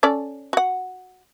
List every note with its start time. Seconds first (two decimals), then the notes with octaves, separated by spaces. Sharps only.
0.03 C#4 A4 D5
0.53 F#4 F#5